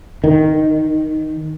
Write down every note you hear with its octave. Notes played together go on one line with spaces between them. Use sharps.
D#3